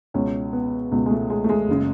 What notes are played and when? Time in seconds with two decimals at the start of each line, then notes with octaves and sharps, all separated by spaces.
0.14 C#2 B2 C#4
0.53 B3
0.91 C#2 B2
1.06 G#3
1.11 A3
1.30 G#3
1.44 A3
1.49 G#3
1.69 F#1 C#3